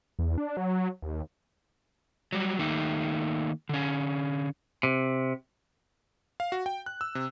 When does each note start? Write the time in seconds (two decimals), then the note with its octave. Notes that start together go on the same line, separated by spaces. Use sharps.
0.19 E2
0.38 D4
0.57 F#3
1.02 D#2
2.33 F#3 G3
2.59 D#3 A3 A#3 D#4
3.69 D3 C#4
4.83 C3
6.40 F5
6.52 F#4
6.66 G5
6.86 F#6
7.01 E6
7.15 C3